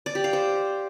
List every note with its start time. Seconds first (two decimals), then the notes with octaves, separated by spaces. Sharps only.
0.06 D5
0.15 G4
0.24 F5
0.33 C5